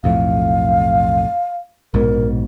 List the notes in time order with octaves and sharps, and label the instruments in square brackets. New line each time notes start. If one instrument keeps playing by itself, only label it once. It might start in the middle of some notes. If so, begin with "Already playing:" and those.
[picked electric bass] B1 F2 A2 [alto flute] F5
[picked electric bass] A#1 G#2 B2 [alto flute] A#4